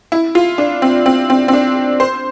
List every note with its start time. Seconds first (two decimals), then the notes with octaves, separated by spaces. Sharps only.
0.12 E4
0.35 F4
0.58 D4
0.82 C4
1.06 C4
1.30 C4
1.48 C4
1.53 D4
2.00 C5